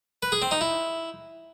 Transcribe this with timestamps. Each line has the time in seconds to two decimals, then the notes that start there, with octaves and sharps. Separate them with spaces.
0.23 B4
0.32 G#4
0.42 C4
0.51 D#4
0.61 E4